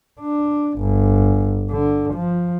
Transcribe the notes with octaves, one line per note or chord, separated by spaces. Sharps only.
D4
G1
D3
F3